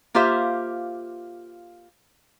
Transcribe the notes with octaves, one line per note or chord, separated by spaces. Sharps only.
A#3 F4 G4 C5 E5 F5